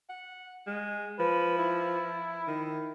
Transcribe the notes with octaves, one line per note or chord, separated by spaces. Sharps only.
F#5
G#3
F3 B4
E4
D#3